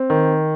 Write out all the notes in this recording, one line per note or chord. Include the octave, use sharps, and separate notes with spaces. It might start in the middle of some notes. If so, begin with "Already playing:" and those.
Already playing: C4
D#3